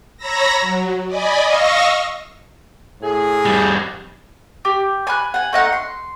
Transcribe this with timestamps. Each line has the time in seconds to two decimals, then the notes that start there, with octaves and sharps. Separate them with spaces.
0.17 C#5 A#5 B5 E6 A#6
0.61 F#3
1.07 D5 D#5 G#5 B5
1.42 D#5 F5 C#6 E6 A#6
3.01 A2 G#4
3.46 F2 G3
4.65 G4
5.07 G#5 B5 F#6
5.34 F#5 G#5
5.53 A3 D#4 F#5
5.72 C6